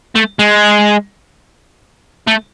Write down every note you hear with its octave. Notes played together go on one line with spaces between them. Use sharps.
A3
G#3
A3